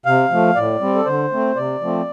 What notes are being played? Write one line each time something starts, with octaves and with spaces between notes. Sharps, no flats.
C3 F5
F3 A3
A2 D5
G3 C4
A4
D3 C5
A3 C4
C3 D5
F3 A3 C4